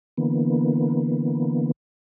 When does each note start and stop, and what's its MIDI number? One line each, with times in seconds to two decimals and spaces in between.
0.17 1.71 50
0.17 1.71 52
0.17 1.71 58
0.17 1.71 59